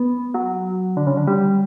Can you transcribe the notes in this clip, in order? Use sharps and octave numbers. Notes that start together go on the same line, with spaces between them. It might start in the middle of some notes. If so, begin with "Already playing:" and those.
Already playing: B3
F#3
D3
C#3
D3
G3